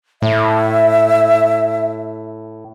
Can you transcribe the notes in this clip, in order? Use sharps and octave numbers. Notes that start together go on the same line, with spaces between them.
A2 E5